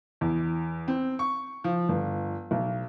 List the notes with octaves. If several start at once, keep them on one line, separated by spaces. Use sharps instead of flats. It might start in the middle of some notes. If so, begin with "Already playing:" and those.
E2
C4
C#6
F3
G1
B1